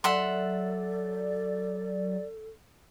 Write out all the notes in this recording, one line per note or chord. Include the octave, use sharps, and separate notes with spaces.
F#3 A4 D5 E5 F#5 C6